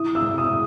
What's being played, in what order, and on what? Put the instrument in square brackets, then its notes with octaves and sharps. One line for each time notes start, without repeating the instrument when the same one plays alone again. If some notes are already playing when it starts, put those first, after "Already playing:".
Already playing: [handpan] E4 [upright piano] D#6
[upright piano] E6
[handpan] G#3
[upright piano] D#6